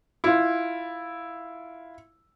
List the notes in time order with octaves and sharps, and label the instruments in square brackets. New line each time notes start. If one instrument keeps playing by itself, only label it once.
[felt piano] E4 F4